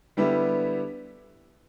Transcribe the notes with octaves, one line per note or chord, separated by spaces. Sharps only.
D3 G3 B3 E4 G4